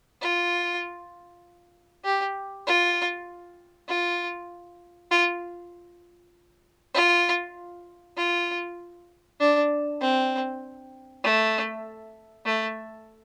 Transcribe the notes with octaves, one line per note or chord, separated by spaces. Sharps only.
F4
G4
F4
F4
F4
F4
F4
D4
C4
A3
A3